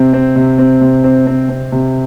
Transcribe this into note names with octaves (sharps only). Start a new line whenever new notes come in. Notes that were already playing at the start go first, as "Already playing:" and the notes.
Already playing: C3 C4
C4
C3
C4
C3
C4
C4
C4
C3